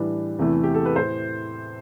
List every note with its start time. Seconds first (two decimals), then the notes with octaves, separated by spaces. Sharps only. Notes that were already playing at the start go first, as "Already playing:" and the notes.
Already playing: A2 E3 G3 D4 B4
0.39 E2 C3 E3 A3 E4
0.63 G4
0.74 A4
0.85 B4
0.96 A2 C5